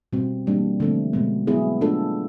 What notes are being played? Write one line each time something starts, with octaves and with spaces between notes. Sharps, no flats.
B2 G3 C4
E3 G3 A#3 D4
D3 F3 A3 C4
B2 G#3 B3
F#3 B3 E4 G#4
A3 D4 F4 A4